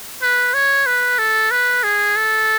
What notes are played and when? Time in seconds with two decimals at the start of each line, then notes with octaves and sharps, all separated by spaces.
0.22 B4
0.54 C#5
0.86 B4
1.19 A4
1.51 B4
1.83 G#4
2.16 A4